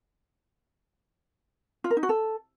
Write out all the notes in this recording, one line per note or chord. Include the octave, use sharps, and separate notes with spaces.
F4
A#4
D#4
F#4
A4